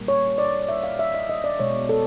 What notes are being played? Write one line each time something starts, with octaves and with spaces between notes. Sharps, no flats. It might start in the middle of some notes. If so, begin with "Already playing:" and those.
Already playing: A#2 G3 A#3
C#5
D5
E5
F5
E5
D#5
D#5
D5
B2 G#3 C#5
A4